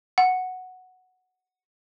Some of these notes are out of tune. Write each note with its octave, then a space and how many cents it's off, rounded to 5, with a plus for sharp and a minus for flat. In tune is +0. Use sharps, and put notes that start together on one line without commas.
F#5 +0